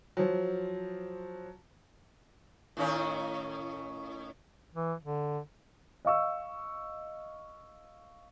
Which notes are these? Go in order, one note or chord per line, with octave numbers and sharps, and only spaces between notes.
F3 F#3
A2 D#3 C#4
E3
D3
D#5 F5 C#6 E6